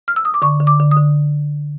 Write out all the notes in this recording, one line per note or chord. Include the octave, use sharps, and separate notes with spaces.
F6
E6
D#6
D6
D3 C#6
D3
D6
D3
D#6
D3